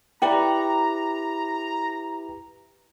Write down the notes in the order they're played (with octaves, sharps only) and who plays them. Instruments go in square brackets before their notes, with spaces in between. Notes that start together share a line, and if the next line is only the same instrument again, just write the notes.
[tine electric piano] E4 G4 B4 [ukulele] D5 G5 [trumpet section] A#5